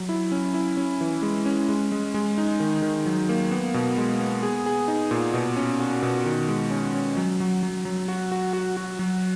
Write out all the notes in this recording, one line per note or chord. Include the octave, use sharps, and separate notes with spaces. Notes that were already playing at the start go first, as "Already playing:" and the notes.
Already playing: F#3
E4
C#4
E4
C#4
E3
G#3
C#4
G#3
G#3
G#3
D#4
D#3
D#3
F#3
A#3
B3
B2
G#3
B3
G#4
G#4
D#4
A#2
B2
C#4
F#4
B2
D#3
G#3
C#4
C#4
F#3
F#3
F#3
F#3
F#4
F#4
F#4
F#4
F#3